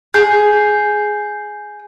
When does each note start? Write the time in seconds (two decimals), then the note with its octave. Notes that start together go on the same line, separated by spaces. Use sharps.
0.14 G#4 G6 C7